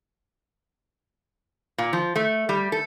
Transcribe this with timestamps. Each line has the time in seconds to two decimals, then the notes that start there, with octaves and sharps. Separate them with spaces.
1.78 A#2
1.93 F3
2.16 A3
2.49 G3
2.72 A4